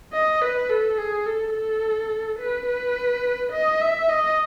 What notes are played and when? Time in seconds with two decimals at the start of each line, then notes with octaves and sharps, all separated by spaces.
0.13 D#5
0.42 B4
0.70 A4
0.98 G#4
1.26 A4
1.54 A4
2.39 B4
2.67 B4
3.52 D#5
3.81 E5
4.09 D#5